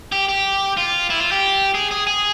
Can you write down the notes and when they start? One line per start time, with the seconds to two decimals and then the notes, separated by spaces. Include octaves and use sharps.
0.12 G4
0.29 G4
0.77 F4
1.10 E4
1.21 F4
1.32 G4
1.75 G#4
1.91 G#4
2.07 G#4